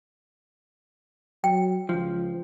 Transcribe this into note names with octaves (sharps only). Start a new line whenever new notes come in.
F#3 G5
C#2 F3